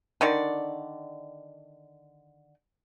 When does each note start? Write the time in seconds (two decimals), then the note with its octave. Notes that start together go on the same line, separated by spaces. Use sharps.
0.21 D3 D#3 D5